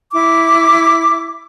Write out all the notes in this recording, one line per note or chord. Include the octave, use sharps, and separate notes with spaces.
E4 D6